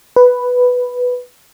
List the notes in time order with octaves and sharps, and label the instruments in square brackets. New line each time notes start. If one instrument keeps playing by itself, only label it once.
[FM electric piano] B4